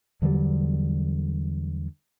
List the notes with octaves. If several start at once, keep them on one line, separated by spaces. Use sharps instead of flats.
E2 D3 F#3 G3